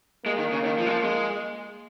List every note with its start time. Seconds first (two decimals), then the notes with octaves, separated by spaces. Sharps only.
0.25 G#3 A#3
0.38 D#3
0.52 C#3
0.65 D#3
0.78 F3
0.87 G#3
0.91 F3
1.04 G#3